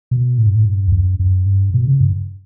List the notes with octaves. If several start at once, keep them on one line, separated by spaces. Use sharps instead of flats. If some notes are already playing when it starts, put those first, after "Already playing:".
B2
A2
G2
A2
G2
E2
F#2
F#2
G2
B2
C#3
G2